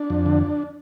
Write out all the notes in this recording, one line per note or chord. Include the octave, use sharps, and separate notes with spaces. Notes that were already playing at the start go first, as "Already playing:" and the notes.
Already playing: D4
F2
D3